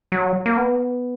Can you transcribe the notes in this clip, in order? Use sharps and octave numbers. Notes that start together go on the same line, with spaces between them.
F#3
A#3
B3